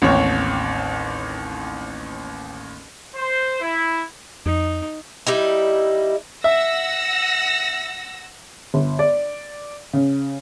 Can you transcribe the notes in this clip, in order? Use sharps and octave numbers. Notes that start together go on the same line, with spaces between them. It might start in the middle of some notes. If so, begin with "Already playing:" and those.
A1 D#2 C4 C#5
C5
E4
F2 D#4
G3 D#4 E4
E5 F#5 E6 A#6
G1
D5
C#3